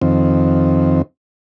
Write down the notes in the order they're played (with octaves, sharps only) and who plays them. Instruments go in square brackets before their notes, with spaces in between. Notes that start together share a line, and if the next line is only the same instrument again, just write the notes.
[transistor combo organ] F2 D#3 C4